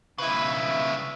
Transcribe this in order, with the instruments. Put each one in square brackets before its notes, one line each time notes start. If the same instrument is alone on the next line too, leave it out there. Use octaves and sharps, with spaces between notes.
[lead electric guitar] C#3 E4 [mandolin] B4 E5